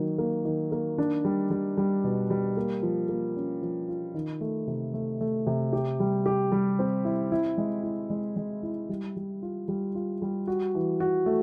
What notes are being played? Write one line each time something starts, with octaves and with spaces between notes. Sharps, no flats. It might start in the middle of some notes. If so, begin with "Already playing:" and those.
Already playing: D#3 F#3 A#3
A#3
D#3
A#3
D4
G3
G3
G3
B2
G3
A#3
F3
A#3
C#4
F3
F4
D#3
A3
C3
A3
A3
C3
G4
G3
G4
G3
C4
E4
E4
G#3
E4
G#3
G#3
E4
G3
G3
F4
G3
F4
G3
F#4
E3
F#4
A3